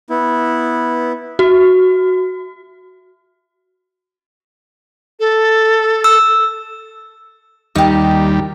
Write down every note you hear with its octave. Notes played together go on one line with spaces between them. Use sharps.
B3 E4
F#4
A4
E6
D#2 G3 D#4 G4